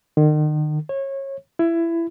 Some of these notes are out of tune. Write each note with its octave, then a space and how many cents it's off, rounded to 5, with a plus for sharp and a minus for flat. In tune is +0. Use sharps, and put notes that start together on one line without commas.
D#3 -40
C#5 -25
E4 +20